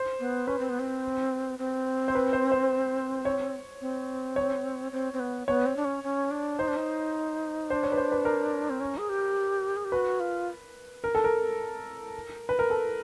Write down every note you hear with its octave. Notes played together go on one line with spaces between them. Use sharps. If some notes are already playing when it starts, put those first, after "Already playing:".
Already playing: C5
B3
C#4 B4
C4
B3
C4
C4
C5
B4
C5
C5
C#5
C4
C#5
C4
C4
B3
B3 C#5
C4
D4
C#4
C#4
D4
D#4 C5
D4
D#4
D4 C5
C#5
B4
C5
B4
A#4
C4
C#4
G#4
G4
G#4
G4
F#4 B4
F4
A#4
A4
A#4
B4
A#4
A4